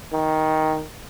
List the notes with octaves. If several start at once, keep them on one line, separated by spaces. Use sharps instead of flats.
D#3